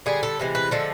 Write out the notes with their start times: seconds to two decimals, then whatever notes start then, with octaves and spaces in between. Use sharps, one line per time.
0.06 D3 G3 G#4
0.23 A4
0.39 C3 E3 G#3
0.55 B4
0.71 D3 F3 G#3 A4